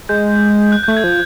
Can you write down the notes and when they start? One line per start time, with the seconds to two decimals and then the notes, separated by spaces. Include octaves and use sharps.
0.09 G#3 G6
0.72 F#6
0.83 A3 G6
0.97 G#6
1.04 F3